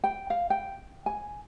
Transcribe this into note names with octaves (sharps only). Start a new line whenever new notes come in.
G5
F5
G5
G#5